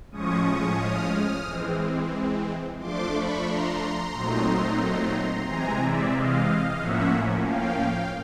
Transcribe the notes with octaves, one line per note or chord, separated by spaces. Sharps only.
A2 F3 G#3 C#4 C#6 D#6
D#6 F6
D#6 F6
E3 G#3 C4
F3 A3 D4 C6 D6
B5 C#6
A#5 C6
A#2 F#3 A3 C4 D#4
C3 E3 G#3 C4 G#5 A#5
D5 E5
D#5 F5
A2 F3 A#3 C#4 E5 F#5
F5 G5